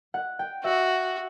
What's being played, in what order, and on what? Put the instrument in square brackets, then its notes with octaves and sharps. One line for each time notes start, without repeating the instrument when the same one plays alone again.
[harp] F#5
G5
[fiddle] F#4 [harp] E5